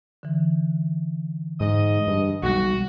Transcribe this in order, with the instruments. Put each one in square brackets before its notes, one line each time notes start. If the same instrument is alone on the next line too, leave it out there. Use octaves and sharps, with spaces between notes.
[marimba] D3 E3
[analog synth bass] G#2 [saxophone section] D#5
[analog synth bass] G2
[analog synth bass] B1 [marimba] G3 G#3 [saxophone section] F#4